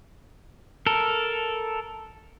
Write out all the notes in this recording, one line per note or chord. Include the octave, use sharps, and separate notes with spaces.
A4 A#4